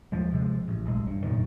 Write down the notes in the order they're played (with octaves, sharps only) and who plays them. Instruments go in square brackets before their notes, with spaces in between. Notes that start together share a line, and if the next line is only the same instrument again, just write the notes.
[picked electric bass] D#2 F3 G#3
C3 F3 G#3
A1
D#1 B1 G#3
G2
F1 F#2 A#2 D#3